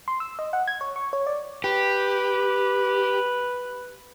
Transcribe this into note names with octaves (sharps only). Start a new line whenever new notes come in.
C6
E6
D#5
F#5
G#6
C#5
C#6
C#5
D5
G4 B4